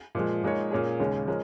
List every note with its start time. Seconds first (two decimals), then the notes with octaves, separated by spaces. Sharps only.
0.15 A#2 F3 G#3
0.43 A#2 G#3 D#4 C#5
0.71 A#2 A#3 C#4 G#4
1.00 D#2 C#3 G#3 C#4 G#4
1.27 F3 G#3 C#4 A#4